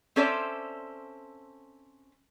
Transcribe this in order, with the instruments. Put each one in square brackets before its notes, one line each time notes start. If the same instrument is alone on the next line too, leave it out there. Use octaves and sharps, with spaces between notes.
[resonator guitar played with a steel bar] C4 C#4 A4 C5 D5 E5